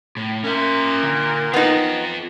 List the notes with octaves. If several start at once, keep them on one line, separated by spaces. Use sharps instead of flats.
A2
A#2 C#4 A#4 E5
D3
B3 D#4 F4 A4